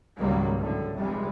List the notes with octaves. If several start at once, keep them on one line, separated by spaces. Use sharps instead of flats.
C#2 G#2 D#3 F#3 G3 A#3
F#2 A2 D3
F1 A#1 C3 G3 G#3